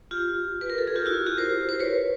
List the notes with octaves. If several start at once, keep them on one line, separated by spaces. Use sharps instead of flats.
F4 G4
B4
A#4
A4
G#4
F4 G4
E4 F#4
F4 G4
A#4 C5
C5
B4 C#5